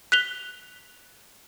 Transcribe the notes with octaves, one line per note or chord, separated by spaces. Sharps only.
F#6 B6 F7 G7